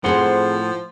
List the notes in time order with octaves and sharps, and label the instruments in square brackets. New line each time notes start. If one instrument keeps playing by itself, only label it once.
[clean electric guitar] A2 F#5 C6 [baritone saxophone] F3 [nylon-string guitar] C4 G#4 C5